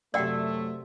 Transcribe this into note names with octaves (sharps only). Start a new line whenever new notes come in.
F#2 C3 F#3 A3 D5 E5 F#5 G5